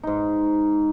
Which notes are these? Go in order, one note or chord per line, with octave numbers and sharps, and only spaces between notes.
G#2 D#4